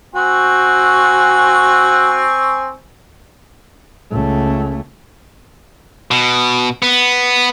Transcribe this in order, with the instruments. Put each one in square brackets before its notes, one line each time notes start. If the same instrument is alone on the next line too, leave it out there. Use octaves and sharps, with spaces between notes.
[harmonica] C4 G#5 C#6 [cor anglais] F#4
[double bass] C#2 A3
[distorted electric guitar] B2
B3